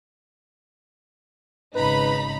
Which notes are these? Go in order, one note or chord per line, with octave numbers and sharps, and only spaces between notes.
G#1 C#3 D#4 B4 A#5 B5